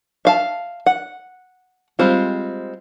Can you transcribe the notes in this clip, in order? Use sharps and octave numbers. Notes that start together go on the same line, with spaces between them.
E5 F5 A5
F#5
G3 G#3 C4 F4